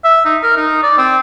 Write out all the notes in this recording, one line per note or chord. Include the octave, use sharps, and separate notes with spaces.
E5
D#4
A#4
D#4
D5
C4